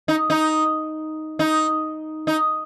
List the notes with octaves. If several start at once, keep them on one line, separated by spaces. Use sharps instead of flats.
D#4
D#4
D#4
D#4